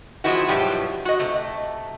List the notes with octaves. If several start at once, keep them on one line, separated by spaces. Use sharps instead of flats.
F3 G#3 C4 E4 F#4
G2 B2 F3 F#3 G4
F#4 D#5
C3 A3